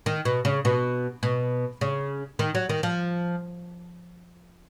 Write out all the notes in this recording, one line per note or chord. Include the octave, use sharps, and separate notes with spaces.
D#3
B2
C#3
B2
B2
C#3
D#3
F#3
D#3
F3